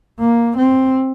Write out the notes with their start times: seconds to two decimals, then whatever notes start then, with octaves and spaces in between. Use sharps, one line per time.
0.20 A#3
0.57 C4